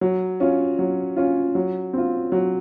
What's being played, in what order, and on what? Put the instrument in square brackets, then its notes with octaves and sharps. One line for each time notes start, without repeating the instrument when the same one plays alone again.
[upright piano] F#3
C#4 F4
F#3
C#4 F4
F#3
C4 F4
F#3